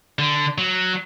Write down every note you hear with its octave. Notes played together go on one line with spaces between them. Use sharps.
D3
F#3